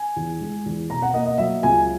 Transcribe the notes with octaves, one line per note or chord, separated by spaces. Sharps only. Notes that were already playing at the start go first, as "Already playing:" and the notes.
Already playing: G#5
E2
G#3
E2
B2 A#5
F#5
A#3 D#5
D#5
F#3 E5
C#2 G#5